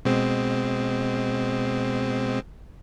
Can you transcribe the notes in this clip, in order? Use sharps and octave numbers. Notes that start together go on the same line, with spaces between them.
B2 G#3 C4